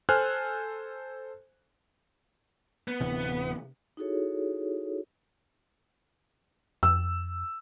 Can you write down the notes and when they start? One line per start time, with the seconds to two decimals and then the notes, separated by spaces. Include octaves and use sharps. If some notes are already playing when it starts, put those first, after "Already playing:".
0.09 A4 C5 G#5 F6 F#6
2.88 B3
3.01 D1 C3 E3
3.97 D#4 E4 F#4 G#4 A4 C#5
6.83 F2 E6